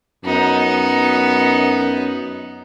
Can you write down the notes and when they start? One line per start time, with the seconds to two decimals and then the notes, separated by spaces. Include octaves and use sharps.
0.25 F#2 B3 D#4